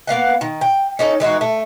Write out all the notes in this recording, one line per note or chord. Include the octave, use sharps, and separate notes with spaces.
A#3 B3 F5 F#5
D#3
G5
C#4 D#4 A4
E3 G#3 D#4 F#4
A3